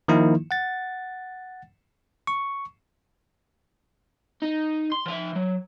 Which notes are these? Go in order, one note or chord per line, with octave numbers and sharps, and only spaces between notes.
D#3 F3 A#3 D#4 E4
F#5 A6
C#6
D#4
C6
F3 E5
F#3